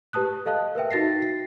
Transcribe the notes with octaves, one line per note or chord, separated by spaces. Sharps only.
G4 B4 A5 D#6 F#6
A4 D#5 F5 A5 F#6
A#4 B4 E5 G5
D#4 F#4 A6 A#6 C7
C7